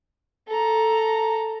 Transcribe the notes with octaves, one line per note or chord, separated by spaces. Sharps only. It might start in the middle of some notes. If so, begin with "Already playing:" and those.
A4 A#5